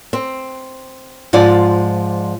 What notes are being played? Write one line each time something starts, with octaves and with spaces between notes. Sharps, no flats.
C4
G#2 F3 F4 D5